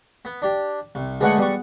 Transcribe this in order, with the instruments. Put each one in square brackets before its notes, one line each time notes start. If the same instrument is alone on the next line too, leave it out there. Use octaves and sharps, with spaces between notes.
[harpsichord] B3
D4 G4
C2
[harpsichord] D3 G#3 A3 [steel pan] G#4 B4 F#5
[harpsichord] G3 C#6 [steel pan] B3